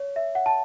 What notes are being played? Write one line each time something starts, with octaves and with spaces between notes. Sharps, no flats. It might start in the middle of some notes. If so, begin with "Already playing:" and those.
Already playing: C#5
E5
F#5
A5